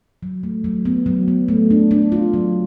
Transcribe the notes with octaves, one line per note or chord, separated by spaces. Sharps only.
F#3
A3
F#3
B3
F#3
B3
A3
D4
D4
F4
F#3